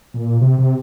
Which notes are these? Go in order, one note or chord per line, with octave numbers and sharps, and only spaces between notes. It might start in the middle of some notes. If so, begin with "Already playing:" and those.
A#2
C3
C3